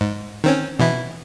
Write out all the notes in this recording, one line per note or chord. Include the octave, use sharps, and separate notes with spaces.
G#2
D#3 C4 C#4
B2 E3 E4